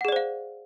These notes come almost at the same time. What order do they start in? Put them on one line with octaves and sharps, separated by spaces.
F#5 G#4 D5 C5 F5